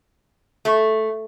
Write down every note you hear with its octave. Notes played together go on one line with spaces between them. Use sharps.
A3